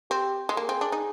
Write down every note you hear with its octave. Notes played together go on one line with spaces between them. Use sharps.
C4 G4
G#3
A#3 G#4
C4
D4
D#4